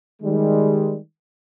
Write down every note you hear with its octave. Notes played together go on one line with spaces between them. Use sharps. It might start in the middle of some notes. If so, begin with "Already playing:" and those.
D#3 G3 G#3